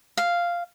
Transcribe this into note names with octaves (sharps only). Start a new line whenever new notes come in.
F5